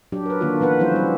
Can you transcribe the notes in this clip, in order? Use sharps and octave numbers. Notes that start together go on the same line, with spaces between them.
F#3 D4 G4
A#4 B4
D3 D#3 A#3 D4 F4 F#4
E3 B3 B4 F#5
F3 G3 C#4 E4 F#4 C5
G3 B3